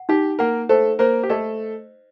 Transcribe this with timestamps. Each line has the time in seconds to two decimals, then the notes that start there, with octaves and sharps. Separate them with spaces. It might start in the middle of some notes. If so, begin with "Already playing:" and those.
Already playing: F#5
0.09 D#4 G4
0.39 A#3 A#4 F#5
0.69 A3 A4 C5
0.99 A#3 A#4 C5
1.23 G4
1.29 A3 A4 D#5